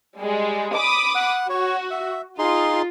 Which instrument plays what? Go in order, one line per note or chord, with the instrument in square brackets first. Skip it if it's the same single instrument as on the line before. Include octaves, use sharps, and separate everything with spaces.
[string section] G3 G#3
B5 D6 D#6
[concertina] F#5
[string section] F#4 [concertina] C#5
[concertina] E5
[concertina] D#4 G#4 C6 [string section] F4